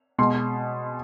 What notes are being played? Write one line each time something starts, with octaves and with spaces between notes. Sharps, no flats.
B2 G#3 C6